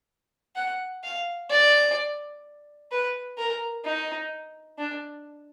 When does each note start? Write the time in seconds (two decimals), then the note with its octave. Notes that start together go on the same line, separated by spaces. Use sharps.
0.56 F#5
1.03 F5
1.50 D5
2.91 B4
3.38 A#4
3.85 D#4
4.79 D4